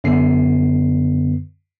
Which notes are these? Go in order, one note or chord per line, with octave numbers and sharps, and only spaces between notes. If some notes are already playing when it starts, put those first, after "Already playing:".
F#2 D3 B3 C7